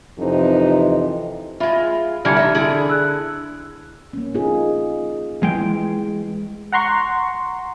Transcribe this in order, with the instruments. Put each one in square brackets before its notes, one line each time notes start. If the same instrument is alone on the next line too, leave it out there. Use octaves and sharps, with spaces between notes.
[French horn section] F2 C3 E3 D#4
[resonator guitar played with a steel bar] G#3 F4 [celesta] E5 B5
[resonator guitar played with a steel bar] D3 E3 G3 [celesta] F6 G#6 C#7
[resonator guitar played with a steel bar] D#4 E5
D3 E4 G#4
[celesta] E6 F#6
[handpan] A#3 C#4
D#4 F4 G#4
[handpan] E3 [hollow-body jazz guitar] G#3 G5
[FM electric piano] F#5 A#5 C6 C#6